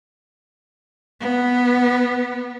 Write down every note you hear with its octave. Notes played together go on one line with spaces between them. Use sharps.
B3